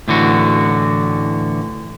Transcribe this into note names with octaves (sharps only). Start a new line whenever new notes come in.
A2 D3 E3 F#4